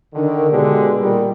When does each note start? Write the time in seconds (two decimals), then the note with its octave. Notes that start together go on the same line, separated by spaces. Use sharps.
0.14 D3 D#3
0.51 B2 D3 G#3 D4 G4
1.00 A#2 D#3 G3